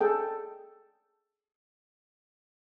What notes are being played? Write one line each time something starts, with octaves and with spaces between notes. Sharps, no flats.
G#4 A4 G5